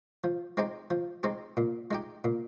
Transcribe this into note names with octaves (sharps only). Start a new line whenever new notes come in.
F3
G#3 C4 D#4 G4
F3
G#3 C4 D#4 G4
A#2
G#3 D#4 G4
A#2